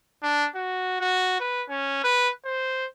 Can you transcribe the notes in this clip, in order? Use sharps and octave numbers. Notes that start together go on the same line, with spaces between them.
D4
F#4
F#4
B4
C#4
B4
C5